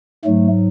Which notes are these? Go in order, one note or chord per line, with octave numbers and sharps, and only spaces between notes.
G#2 F#3 A3